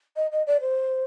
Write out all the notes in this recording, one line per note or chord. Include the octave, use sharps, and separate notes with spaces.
D#5
D#5
D5
C5